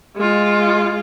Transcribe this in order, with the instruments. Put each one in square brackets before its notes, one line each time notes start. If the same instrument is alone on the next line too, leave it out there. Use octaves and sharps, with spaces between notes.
[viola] G#3 F4